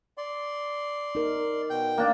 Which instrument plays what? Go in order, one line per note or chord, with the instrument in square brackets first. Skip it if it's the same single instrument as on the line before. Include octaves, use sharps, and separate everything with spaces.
[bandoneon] D5 C6
[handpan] D#4 A#4
[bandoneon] B2 G5 G6
[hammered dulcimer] A#3 D4